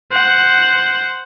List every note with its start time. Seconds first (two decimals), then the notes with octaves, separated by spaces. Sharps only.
0.12 C5 F#5